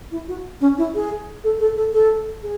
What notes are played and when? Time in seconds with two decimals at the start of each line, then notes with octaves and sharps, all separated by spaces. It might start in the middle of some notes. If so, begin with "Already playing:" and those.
0.11 E4
0.27 F#4
0.60 C#4
0.77 E4
0.94 G#4
1.43 A4
1.59 A4
1.76 A4
1.92 A4
2.42 G#4